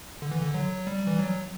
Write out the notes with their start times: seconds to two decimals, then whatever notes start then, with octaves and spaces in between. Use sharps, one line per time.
0.22 D3
0.31 E3
0.42 D3
0.54 F#3
0.87 G3
1.07 E3
1.19 F#3